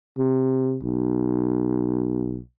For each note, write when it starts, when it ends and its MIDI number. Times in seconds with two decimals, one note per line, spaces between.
0.18 0.77 48
0.82 2.38 35